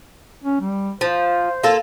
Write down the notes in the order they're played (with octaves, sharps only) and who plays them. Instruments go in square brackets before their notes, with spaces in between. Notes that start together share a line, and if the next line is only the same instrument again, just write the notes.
[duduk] C#4
G3
[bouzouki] F3 [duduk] C5
[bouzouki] A#3 F4 A4